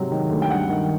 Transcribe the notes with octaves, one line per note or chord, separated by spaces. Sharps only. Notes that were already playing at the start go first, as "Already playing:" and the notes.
Already playing: G#2 C3 F#3
D#3
D2
G5
G2 F#5
D#3